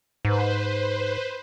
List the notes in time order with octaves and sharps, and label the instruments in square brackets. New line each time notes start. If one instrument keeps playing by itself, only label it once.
[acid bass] G#2 [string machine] B4 C5